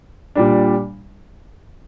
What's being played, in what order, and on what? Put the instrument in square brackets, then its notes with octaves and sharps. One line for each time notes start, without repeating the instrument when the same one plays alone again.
[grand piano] A#2 G3 D4